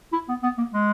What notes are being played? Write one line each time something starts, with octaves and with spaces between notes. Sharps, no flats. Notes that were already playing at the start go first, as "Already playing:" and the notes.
E4
B3
B3
A#3
G#3